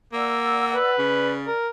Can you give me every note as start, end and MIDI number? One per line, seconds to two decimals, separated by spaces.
0.13 0.76 58
0.13 0.95 74
0.13 0.95 78
0.13 0.95 88
0.75 1.33 71
0.98 1.47 49
0.98 1.58 74
1.48 1.69 70